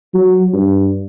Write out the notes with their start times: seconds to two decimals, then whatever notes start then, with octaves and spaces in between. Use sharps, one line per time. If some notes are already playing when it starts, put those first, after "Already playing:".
0.14 F#3
0.53 G2